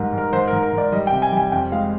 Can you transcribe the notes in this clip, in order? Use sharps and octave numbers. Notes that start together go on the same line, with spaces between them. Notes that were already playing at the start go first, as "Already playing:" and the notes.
Already playing: G#2 G3 A#4
G#2
A#4
G#2 C5
A#4
G#2
A#4
G#2
D5
G3 D#5
G5
C3
G#5
G3 G#5
F2 G5
G#3 F5